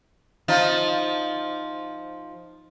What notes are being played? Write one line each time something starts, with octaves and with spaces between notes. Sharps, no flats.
F3 D#4 F4